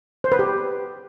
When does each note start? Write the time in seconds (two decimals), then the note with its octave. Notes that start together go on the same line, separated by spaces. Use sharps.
0.24 C5
0.32 B4
0.39 G4